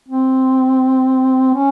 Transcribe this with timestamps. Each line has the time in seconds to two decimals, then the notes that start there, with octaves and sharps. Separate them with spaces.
0.08 C4
1.54 C#4